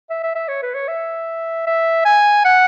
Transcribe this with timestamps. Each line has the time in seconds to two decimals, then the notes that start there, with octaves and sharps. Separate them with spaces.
0.10 E5
0.23 E5
0.35 E5
0.48 C#5
0.62 B4
0.74 C#5
0.88 E5
1.67 E5
2.05 G#5
2.45 F#5